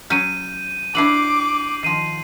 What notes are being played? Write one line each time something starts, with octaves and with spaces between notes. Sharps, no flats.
F#3 C#4 G6 D#7
D4 E4 F#4 D6 C7 F#7
D#3 F3 C7 D#7